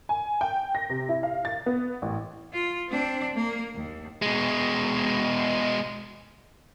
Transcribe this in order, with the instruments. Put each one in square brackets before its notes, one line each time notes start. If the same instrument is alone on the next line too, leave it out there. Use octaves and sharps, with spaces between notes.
[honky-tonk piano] G#5
G5
A#6
C3
E4
F5
A6
B3
A1
[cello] F4
C4 D4
A#3
D#2
[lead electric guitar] B2 G#3